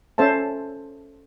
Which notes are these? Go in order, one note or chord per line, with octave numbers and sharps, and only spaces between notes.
C#4 A4 C5 E5 A5